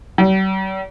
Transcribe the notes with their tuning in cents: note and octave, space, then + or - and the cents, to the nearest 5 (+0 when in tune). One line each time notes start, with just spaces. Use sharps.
G3 -45